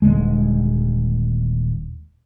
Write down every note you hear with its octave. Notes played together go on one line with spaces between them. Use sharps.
D#1 D3 G#3